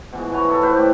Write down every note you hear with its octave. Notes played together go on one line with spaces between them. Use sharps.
B2 E3 G#3
B2 B4 C#5 A#5
E4 A4
A2 B4 C5
G4 D5